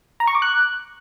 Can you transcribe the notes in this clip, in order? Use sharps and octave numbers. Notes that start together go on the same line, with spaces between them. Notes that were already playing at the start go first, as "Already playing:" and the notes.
A#5
C#6
D6
F#6